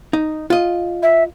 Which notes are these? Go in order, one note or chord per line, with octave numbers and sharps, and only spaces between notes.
D#4
F4 D#5
E5